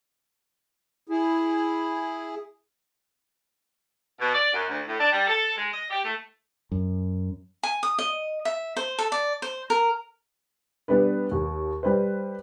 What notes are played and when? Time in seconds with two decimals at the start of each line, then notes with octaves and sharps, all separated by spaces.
1.09 E4 G#4
4.21 B2
4.33 D5
4.54 F#2
4.69 D2
4.87 A2
4.99 D4
5.12 G3
5.27 A4
5.56 G#3
5.72 D#5
5.90 G4
6.04 A3
6.72 F#2
7.63 G#5
7.83 D#6
7.99 D#5
8.45 E5
8.77 C5
8.99 A4
9.12 D5
9.42 C5
9.70 A#4
10.88 G3 B3 D4 B4
11.31 D#2
11.83 G3 B4 C5